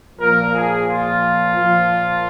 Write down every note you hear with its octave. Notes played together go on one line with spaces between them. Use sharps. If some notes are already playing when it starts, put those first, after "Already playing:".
A#2 F3 A#4
G#4
F4
A#2 F3